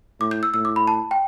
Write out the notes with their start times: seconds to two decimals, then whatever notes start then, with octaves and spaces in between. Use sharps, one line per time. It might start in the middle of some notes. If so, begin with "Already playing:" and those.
0.20 A2 D6
0.31 G6
0.43 E6
0.54 A2 E6
0.65 D6
0.76 B5
0.88 A5
1.11 G5